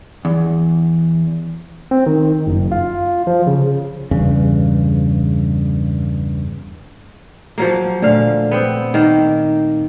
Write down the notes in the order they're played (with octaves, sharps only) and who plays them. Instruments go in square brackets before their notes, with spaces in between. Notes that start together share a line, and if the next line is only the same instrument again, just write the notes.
[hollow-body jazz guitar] E2
[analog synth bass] C4
D#3
F#1
F4
F3
C#3
[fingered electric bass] E2 G2 C#3
[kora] F3 F#3 A#3
[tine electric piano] A#2 A3 [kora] D3 F5
[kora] B3 C4 G5
D#3 A#3